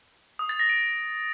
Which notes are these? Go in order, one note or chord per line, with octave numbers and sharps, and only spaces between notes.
D#6
A6
A#6
D7